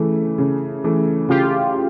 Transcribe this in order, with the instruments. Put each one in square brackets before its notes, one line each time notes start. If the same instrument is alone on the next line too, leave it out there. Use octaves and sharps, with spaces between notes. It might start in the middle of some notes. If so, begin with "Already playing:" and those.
Already playing: [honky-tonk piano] C#3 E3 A3
C#3
E3 A3
[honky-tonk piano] C#3 [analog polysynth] F4 G4